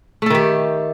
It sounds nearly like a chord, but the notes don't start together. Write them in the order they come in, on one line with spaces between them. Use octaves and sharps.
A3 A4 D#3 G4